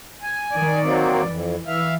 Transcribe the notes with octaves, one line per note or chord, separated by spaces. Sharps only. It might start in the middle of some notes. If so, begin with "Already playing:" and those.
G#5
D#3 D5
F#3 A#3 C4
F2 E3
E3 E5 F5